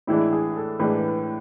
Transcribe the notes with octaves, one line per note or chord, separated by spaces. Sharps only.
A2 E3 G#3 D4 E4
G#4
A4
A2 E3 G#3 D4 B4
B4